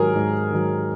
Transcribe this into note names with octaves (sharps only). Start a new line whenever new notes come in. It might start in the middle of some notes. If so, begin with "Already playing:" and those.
Already playing: G#2 D#3 F#3 G#4 A#4
G#2
D#3 F#3